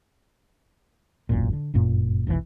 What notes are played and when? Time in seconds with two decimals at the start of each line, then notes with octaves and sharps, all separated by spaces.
1.29 E1 A1 F#2 A#2
1.53 D3
1.74 G1 F#2 A#2 A#3
2.27 F1 B1 C3 E3